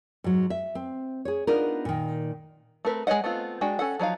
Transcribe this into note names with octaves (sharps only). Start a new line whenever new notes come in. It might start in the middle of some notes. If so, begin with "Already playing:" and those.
G#2 F#3
E5
C4
G#4 C#5
B3 D4 D#4 F4 A#4
A#2 D#3
A3 C4 A#4 B4
G#3 A#4 C#5 D#5 F#5
A3 B3 C4 F4
G#3 D4 F#4 G5
C#4 A4 F#5
F3 F#3 D#4 F5